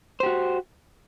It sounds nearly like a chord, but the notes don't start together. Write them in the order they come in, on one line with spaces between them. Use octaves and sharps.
C5 G4 F#4